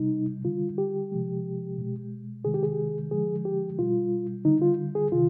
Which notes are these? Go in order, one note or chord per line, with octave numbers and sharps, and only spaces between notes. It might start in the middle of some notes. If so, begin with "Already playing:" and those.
Already playing: C3 G3 D#4
D3 G3 F4
G4
C3 F3 G#3
B2 G#3
C3 D#3 G#3 G#4
G4
G#4
D3 F3 G#3 G#4
G4
B2 G3 F4
D3 G3 D#4
F4
G#4
C3 D#3 F4